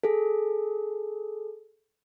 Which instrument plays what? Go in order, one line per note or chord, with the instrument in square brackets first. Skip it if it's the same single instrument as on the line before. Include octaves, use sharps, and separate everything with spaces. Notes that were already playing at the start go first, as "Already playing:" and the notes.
[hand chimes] G#4 A4